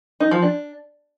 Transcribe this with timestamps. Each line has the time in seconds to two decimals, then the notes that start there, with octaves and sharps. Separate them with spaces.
0.20 D#4
0.31 F3
0.42 D4